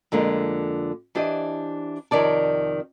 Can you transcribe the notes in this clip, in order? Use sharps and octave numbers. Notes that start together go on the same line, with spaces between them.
F2 D3 G#3 A#3 F4
E3 D4 G4 C5 D#5
F2 C3 D#3 C#5 D5 A5